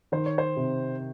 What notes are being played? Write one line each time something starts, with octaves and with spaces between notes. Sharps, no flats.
D#3 C5
C#5
C5
C3